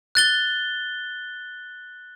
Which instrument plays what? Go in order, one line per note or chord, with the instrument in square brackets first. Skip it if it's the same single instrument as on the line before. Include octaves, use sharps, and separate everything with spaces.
[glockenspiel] F#6 A6 G7